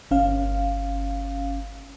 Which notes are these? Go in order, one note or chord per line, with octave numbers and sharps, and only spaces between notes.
G1 C#4 F5